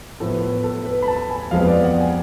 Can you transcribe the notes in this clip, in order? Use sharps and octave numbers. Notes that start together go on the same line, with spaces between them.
A2 F3 B3 A4
B4
A4
B4
B5
A5
G#5
F2 F3 G#3 B3 F5
D5
F#5
G#5